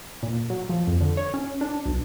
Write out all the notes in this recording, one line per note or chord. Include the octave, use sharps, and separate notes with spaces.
A#2
F#3
F3
F2
D3
C#5
C#4
D4
B1